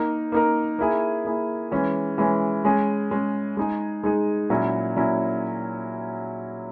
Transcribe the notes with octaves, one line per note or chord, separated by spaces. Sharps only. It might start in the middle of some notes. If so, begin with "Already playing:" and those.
Already playing: A#3 D#4 A#4
A#3 D#4 A#4
A#3 E4 G#4
A#3 E4 G#4
E3 G#3 C#4
E3 G#3 C#4
G#3 C#4 G#4
G#3 C#4 G#4
G#3 D#4 G#4
G#3 D#4 G#4
A#2 F#3 C#4 E4
A#2 F#3 C#4 E4